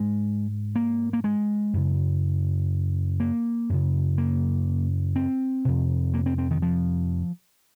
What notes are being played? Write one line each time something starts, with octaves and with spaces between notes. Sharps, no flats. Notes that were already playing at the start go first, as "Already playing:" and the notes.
Already playing: G#2 G#3
A#3
A#3
G#3
F#2 C#3
A#3
F#2 C#3
A#3
C4
F2 C3
A#3
C4
C4
D#3
F3